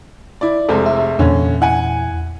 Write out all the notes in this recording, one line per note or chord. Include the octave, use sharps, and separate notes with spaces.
E4 D5
F1 C3 G#3 A4
E5
E2 A#2 D3 C#4
E4 F#5 G#5